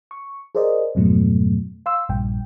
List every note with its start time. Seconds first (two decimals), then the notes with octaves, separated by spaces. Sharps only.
0.11 C#6
0.55 G#4 A#4 C5 D5 D#5
0.95 F2 G#2 B2 F#3 A3
1.86 F5 C6 E6
2.09 A#1 G2 A#2 G5